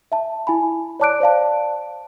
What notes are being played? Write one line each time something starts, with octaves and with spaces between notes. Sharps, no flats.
E5 A5
E4 G#5 B5
C#5 D5 A5 D6 F#6 D7
C5 D5 F5 A5